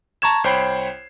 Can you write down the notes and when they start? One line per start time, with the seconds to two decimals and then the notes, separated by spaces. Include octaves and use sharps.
0.22 A5 A#5 C#6 G#6 E7
0.44 C2 C5 C#5 G5 B5 C7